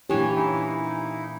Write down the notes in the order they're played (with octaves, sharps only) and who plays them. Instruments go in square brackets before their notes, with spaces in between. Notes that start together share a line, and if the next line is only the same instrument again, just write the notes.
[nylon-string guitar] A#2 D4 [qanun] E3 C#4 [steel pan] G4 [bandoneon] C#5
[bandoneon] D#4 E4